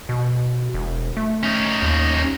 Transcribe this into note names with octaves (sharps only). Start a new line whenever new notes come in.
B2
E1
A3
C#4 D#4
D#2